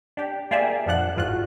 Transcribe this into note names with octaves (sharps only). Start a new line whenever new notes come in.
D4 G4
A#3 F4 G4 G#4 D5 E5
F2 A#2 F3 D4 F#5 F#6
G1 E2 G#2 F4 F#4 F#6